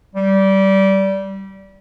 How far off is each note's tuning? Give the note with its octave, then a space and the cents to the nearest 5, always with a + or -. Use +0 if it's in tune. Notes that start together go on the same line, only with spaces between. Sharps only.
G3 -20